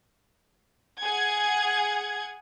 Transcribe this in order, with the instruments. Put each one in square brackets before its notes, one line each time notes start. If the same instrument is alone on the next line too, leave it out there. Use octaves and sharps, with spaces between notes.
[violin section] G#4 F#5 G#6